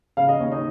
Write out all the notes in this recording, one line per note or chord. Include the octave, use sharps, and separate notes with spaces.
C#3 F5
D#5
D#2 C#5
D#4 D#5